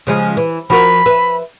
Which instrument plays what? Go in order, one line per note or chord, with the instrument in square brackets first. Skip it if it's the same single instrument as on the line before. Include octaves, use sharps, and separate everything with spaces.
[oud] C#3 F3 G#3
E3
[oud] F3 F#4 A#4 [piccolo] B5
[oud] B4 E5